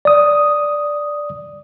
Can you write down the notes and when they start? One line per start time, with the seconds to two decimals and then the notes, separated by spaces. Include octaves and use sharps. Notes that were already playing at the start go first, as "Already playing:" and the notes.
0.05 D5 D#6